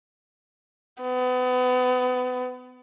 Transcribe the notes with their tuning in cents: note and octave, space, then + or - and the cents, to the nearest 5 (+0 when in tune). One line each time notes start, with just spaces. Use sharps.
B3 +30